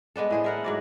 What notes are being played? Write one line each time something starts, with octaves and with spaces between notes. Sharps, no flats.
G#3 B3 D4 A4
A2 G#4 C5
E4 A#4 F#5
G#2 F#3 D5